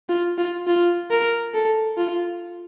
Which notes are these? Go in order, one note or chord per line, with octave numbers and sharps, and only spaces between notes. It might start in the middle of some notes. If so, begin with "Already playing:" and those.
F4
F4
F4
A#4
A4
F4